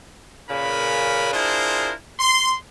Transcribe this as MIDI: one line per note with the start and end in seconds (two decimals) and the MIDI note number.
0.50 1.33 46
0.50 1.33 49
0.50 1.33 61
0.50 1.33 70
0.50 1.33 71
0.50 1.33 83
1.34 1.92 62
1.34 1.92 64
1.34 1.92 65
1.34 1.92 68
1.34 1.92 70
1.34 1.92 72
2.20 2.53 84